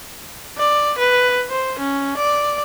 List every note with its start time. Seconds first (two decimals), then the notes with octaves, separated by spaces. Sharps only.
0.58 D5
0.98 B4
1.50 C5
1.79 C#4
2.17 D5